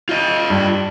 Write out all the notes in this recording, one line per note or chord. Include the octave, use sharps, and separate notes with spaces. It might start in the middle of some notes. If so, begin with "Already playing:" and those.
F4 D#5
G2